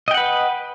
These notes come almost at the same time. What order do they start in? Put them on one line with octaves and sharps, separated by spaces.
D#5 G5 F#5 B4